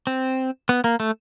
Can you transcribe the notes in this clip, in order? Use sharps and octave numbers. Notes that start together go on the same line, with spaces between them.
C4
B3
A#3
A3